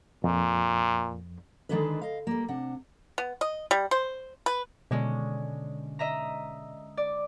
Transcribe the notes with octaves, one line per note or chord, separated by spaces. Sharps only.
F2 A#2
D3 D#3 G#3 A3 D4 B4
D#5 F5
G3 A#3
C3 D4 F#5
B3
D#5
G3
C5
B4
B2 D3 G#3 C#4
D#5 E5 A#5
D5